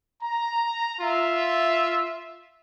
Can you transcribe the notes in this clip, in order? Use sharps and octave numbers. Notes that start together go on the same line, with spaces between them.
A#5
F4 E5